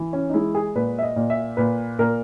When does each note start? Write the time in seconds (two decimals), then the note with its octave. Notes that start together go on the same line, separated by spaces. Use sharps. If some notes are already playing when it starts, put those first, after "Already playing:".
Already playing: E3
0.13 C#4
0.30 D#4
0.33 G#3 E4
0.55 G#4
0.75 A#2 B4
0.99 E5
1.03 D#5
1.16 A#2
1.30 E5
1.57 A#2 B4
1.99 A#2 A#4